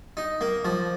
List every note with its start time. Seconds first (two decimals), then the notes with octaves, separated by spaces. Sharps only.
0.17 D#4
0.41 A#3
0.65 F3